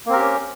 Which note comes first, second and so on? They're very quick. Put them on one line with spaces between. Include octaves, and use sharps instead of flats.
A#3 C4 A#4 G4 C#4